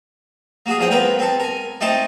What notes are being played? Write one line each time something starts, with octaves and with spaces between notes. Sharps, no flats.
A#3 F#4 G#4
E2 F3 G#4 F#5 G5
B3 C4 A#4 B4 G5
C4 A4
A#4 G#5
A3 C4 D#4 C5 D#5 A5